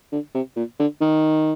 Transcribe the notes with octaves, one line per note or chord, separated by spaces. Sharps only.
D3
C3
A#2
D3
D#3